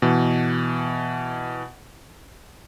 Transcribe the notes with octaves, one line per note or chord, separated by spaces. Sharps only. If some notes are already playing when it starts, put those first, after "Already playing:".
B2 E3